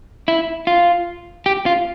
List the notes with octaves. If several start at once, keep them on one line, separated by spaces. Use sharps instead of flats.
E4
F4
G4
F4